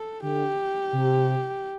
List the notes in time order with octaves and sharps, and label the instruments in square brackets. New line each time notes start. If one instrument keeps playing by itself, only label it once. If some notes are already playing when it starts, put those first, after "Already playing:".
Already playing: [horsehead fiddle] A4
[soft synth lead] D3 [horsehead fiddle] G4
[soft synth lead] C3